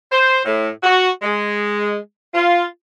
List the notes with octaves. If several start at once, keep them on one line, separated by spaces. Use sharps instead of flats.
C5
A2
F#4
G#3
F4